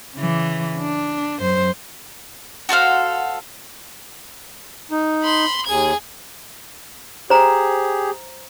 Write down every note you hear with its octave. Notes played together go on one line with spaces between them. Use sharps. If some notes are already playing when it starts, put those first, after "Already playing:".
C#3 E3
D4
F#2 C5
F#4 A4 C5 F5
D#4
B5 C6
D#2 G#4 G#6
G4 G#4 C5 A#5